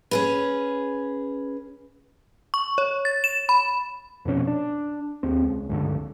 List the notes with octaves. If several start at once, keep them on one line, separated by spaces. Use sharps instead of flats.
C#4 G#4 B4
C#6
C#5
A6
E7
B5
F2 B2 C#4
D4
D#2 C4
C#2
C#2 G2 D3